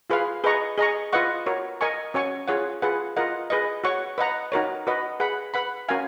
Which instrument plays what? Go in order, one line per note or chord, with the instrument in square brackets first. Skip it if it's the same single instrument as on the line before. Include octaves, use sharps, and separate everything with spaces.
[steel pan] F4 G#4 B4 F5
G#4 B4 D#5 A#5 C#6
G#4 D#5 A#5 C#6
F4 B4 D#5 F#5 C#6
F#4 A#4 C#5
A#4 D#5 G#5 C#6
C#4 F#4 C#5 G#5 C#6
F4 G#4 C#5 F#5
F4 G#4 B4 F#5
F4 A#4 D#5 F#5
G#4 B4 D#5
F#4 C#5 F#5 C#6
B4 D#5 F#5 A#5
D#4 F#4 A#4 C#5
F#4 B4 D#5
G#4 B4 F#5 B5
B4 F#5 B5
C#4 F#4 A#4 F5 G#5